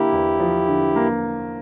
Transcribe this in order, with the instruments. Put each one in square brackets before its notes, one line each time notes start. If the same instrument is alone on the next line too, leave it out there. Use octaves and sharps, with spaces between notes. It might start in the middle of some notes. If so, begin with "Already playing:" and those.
Already playing: [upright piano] D3 A#3 [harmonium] E4 G4
[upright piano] E2
F3
D3
A#3